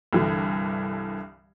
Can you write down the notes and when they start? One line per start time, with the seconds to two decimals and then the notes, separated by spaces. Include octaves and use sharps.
0.13 C2 G2 D3 E3